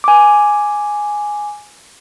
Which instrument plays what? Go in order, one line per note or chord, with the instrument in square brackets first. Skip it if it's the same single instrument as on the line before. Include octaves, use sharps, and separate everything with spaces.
[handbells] G#5 D6